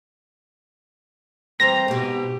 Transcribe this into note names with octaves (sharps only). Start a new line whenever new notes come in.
E3 G3 C4 C5 A#5 A#6
G#2 B2 G4